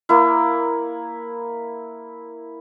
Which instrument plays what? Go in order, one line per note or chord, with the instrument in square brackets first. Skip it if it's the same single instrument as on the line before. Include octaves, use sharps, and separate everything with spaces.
[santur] A#3 E4